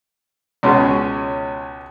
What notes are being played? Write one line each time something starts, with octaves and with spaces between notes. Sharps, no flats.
C#2 B2 G#3 C#4